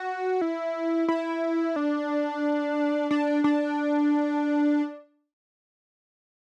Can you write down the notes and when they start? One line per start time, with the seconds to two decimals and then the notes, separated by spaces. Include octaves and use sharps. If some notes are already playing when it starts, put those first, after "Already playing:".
Already playing: F#4
0.41 E4
1.08 E4
1.76 D4
3.11 D4
3.44 D4